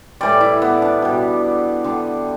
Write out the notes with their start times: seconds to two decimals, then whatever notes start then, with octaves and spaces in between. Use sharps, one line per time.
0.21 A2 E3 G3 D5
0.41 E4
0.62 B3
0.82 D4
1.02 B2 G3
1.84 D3 G3